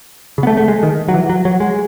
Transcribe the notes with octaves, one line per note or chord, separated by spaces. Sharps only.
C#3
B3
A3
A3
G#3
D#3
F#3
E3
F#3
F#3
G#3